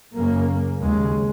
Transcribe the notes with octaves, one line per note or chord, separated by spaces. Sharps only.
F#2 C#3 A#3
D#2 C#3 G#3